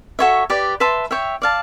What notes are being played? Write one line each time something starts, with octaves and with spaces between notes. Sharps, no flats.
F#4 A4 C#5 E5
G4 B4 D5
B4 E5 A5 C6
C#5 E5 G5
D5 F5 A5